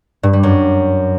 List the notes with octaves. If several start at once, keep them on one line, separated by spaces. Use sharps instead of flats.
G2
G3
F#2